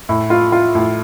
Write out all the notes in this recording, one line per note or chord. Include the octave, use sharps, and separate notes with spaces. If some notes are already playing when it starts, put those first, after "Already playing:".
A2
F4
F4
A2